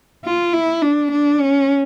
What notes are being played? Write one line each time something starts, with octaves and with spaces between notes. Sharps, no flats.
F4
E4
D4
D4
C#4